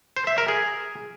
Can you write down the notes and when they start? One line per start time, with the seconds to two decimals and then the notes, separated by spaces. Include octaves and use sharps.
0.17 C5
0.27 E5
0.38 A#4
0.48 G#4